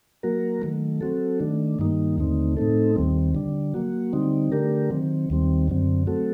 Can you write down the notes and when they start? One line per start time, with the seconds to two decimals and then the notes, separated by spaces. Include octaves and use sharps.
0.23 F#3 A#3 F#4 A#4
0.62 D#3 F#3 A3
1.01 F#3 C4 F#4 A4
1.40 D#3 A3 D4
1.79 G2 D#3 G3 A#3 D#4
2.17 D#2 D3 A3 C4 D#4
2.57 A2 A3 C4 D#4 A4
2.95 D#2 D#3 G3 C4
3.34 D3 G3 D4
3.74 F#3 A#3 F#4
4.13 D3 G3 C4 D#4
4.52 D3 A3 D4 G4 A#4
4.90 D#3 F#3 C4
5.30 D#2 D#3 G3 C4
5.68 F#2 D3 F#3 C4
6.07 F#3 A3 C4 F#4 A4